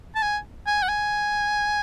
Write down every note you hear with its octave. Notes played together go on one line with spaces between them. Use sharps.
A5
G#5
G#5
F#5
G#5